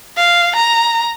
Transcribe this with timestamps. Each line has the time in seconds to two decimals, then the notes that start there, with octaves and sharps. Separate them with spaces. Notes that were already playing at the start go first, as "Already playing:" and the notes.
0.17 F5
0.56 A#5